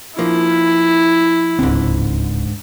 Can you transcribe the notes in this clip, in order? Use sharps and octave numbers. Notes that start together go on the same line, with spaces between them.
F3 A#3 E4
D1 C#2 G#2 D3 C4